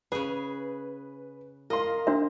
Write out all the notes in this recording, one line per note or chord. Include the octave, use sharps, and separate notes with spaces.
C#3 G#4 B4
A#4 D#5 F5 C6
D4 F#4 E5